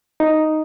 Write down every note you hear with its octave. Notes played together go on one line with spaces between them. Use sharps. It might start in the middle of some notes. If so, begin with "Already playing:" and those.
D#4